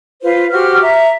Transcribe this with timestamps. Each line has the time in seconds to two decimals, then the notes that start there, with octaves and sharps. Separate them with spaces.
0.22 F4 B4 C5
0.51 F#4 G4 C5 F6
0.81 E5 A#5